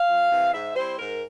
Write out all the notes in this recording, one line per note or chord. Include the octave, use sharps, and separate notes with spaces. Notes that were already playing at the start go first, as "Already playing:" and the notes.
Already playing: F5
F2
C3 E3
G#2 E5
G3 C4 E4 C5
G#2 A#4